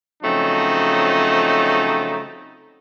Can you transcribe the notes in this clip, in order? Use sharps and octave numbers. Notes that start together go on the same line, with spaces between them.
C#3 F3 F#3 A3 C4 D#4